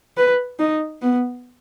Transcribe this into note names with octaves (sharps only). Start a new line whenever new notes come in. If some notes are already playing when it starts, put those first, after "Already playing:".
B4
D#4
B3